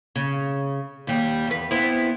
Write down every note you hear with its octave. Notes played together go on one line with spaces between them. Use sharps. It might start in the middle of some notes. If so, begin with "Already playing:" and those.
C#3
D#2 G3
E2 B4
B3 C4 E4